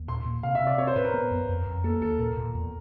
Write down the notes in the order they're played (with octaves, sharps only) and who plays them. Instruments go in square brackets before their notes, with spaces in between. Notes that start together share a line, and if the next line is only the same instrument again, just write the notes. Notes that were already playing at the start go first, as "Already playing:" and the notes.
Already playing: [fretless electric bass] D#2
[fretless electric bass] A#2 [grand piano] C6
[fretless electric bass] A#2
[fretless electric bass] C3 [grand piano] F5
[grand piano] E5
[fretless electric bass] C3
[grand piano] D5
[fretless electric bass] C4 [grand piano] C#5
[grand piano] C5
[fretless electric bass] A2 [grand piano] B4
[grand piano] A#4
[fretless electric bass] B3
F#2
F2
F2
[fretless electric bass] A#3 [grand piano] A4
[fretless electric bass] D#2 [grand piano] A4
[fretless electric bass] A#2 [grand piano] A#4
[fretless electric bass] A#2
E2